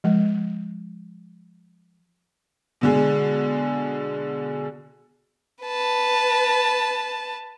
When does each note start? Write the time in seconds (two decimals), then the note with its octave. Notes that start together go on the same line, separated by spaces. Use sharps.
0.04 F3 G#3
2.81 B2 D3 G#3
5.64 B4 A5